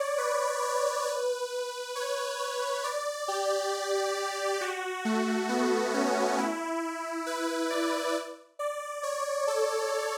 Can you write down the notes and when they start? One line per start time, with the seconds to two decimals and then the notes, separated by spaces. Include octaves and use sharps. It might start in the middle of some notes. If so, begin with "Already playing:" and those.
Already playing: C#5 D5
0.18 B4
0.63 C#5
1.07 B4
1.95 C#5
2.39 C#5
2.84 D5
3.28 G4
4.61 F#4
5.05 A3
5.49 B3
5.94 C#4
6.38 E4
7.26 B4
7.70 D5
8.59 D5
9.03 C#5
9.47 A4